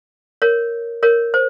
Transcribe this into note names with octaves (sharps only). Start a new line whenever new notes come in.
A#4 C#5
A#4 C#5
C5